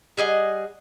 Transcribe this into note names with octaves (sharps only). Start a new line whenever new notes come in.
G3 G#4 D#5 F#5